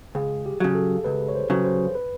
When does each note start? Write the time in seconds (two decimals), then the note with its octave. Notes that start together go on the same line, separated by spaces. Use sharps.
0.15 C#2 G#4
0.46 G4
0.60 C#3 F#3
0.75 A4
1.04 C#2 B4
1.28 C#5
1.35 C5
1.50 C#3 F#3
1.65 C5
1.95 B4